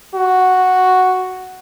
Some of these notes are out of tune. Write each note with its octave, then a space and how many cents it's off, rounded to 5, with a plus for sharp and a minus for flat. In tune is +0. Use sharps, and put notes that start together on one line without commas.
F#4 +0